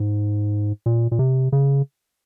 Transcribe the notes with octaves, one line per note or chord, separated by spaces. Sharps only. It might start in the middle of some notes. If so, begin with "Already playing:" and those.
Already playing: G#2
A#2
A#2
C3
C#3